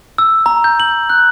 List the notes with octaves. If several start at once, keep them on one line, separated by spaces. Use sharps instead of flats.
E6
A#5
G6
F#7
F#6